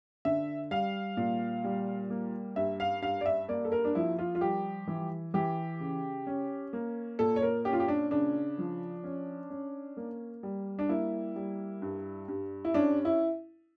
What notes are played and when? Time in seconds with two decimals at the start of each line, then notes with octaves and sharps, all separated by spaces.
0.25 D3 E5
0.71 G3 F5
1.17 A#2
1.64 G3
2.10 A#3
2.56 G2 E5
2.80 F5
3.02 G2 F5
3.21 D5
3.26 E5
3.48 A#3 D5
3.65 A4
3.72 A#4
3.85 D4
3.95 F3 E4
4.19 F4
4.35 F4
4.41 G3 G4
4.87 E3
5.34 E3 G4
5.80 C#3
6.27 C#4
6.73 A#3
7.19 A#2 A4
7.36 C#5
7.42 A#4
7.65 C#4 G4
7.73 F4
7.80 G4
7.88 D4
8.11 C#3 D4
8.58 F3
9.04 C#4
9.50 C#4
9.97 A#3
10.43 G3
10.79 D4
10.89 A#3 E4
11.36 G3
11.82 G2
12.28 G2
12.65 E4
12.74 C#4 D4
13.05 E4